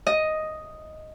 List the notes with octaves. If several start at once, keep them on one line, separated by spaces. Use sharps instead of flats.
D#5